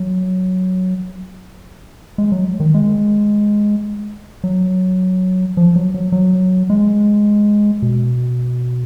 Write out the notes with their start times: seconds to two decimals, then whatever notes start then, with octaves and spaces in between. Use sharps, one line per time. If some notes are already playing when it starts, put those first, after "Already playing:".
Already playing: F#3
2.18 G#3
2.32 F#3
2.60 D#3
2.74 G#3
4.44 F#3
5.57 F3
5.76 F#3
5.94 F#3
6.12 F#3
6.70 G#3
7.82 B2